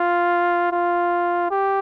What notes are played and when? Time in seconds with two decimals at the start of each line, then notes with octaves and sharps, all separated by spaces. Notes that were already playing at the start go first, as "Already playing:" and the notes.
Already playing: F4
0.72 F4
1.50 G4